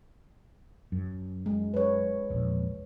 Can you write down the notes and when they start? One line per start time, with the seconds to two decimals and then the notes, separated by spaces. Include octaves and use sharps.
0.92 F#2
1.46 G#3
1.74 B4 C#5
2.30 E1 A#1